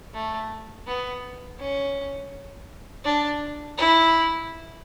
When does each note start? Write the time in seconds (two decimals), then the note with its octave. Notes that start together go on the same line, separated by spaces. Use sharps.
0.14 A3
0.87 B3
1.59 C#4
3.04 D4
3.78 E4